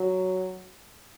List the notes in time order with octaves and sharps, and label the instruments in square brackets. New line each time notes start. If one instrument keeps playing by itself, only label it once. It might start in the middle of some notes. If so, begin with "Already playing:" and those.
Already playing: [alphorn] F#3